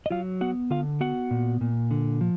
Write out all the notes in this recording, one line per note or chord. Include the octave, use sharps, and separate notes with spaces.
D#5
F#3 F4 F5
B3 F#4 F#5
D3 F4 F5
B3 F#4 F#5
A#2
A#2
D3
F3